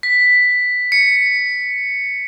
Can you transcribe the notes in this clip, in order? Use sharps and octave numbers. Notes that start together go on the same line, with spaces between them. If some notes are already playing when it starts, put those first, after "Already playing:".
B6
C#7